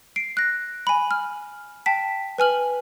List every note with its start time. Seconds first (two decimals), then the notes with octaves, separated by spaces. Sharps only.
0.16 C7 D7
0.37 F#6 A#6
0.87 G#5 B5
1.11 F6
1.86 G5 A5 B6
2.38 B4 G#5 F6 F#7